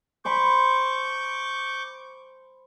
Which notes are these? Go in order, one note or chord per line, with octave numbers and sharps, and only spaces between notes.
C5 A5 B5 C#6 D6 G6